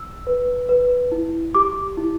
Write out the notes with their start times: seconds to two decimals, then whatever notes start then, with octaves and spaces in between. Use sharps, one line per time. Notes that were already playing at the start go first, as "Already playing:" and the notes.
Already playing: E6
0.27 B4
0.69 B4
1.12 E4
1.55 G4 D6
1.97 E4